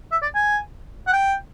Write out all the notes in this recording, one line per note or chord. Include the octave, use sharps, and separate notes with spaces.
E5
D5
G#5
F#5
G5